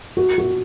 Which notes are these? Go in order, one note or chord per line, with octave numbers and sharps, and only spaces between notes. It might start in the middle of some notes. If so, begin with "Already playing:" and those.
F#4
F#4